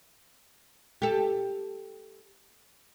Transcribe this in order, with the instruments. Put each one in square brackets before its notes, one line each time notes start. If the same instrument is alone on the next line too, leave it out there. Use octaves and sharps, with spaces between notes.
[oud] G4 A4